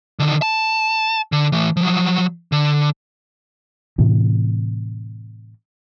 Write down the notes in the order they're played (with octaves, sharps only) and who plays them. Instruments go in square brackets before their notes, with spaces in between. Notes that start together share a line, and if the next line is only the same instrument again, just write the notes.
[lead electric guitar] D3 D#3
A5
D3
E3 A3
F3 F#3
D3
[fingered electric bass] A2 C3 E3